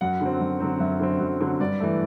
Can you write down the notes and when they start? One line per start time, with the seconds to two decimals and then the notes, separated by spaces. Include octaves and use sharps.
0.01 F#2 F#5
0.21 D3 F#3 C4
0.41 F#2
0.60 D3 F#3 C4
0.80 F#2 E5
1.00 D3 F#3 C4
1.20 F#2
1.41 D3 F#3 C4
1.59 G2 D5
1.80 E3 A3